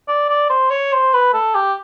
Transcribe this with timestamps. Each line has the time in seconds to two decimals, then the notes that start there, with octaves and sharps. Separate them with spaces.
0.08 D5
0.29 D5
0.50 C5
0.71 C#5
0.93 C5
1.14 B4
1.33 A4
1.55 G4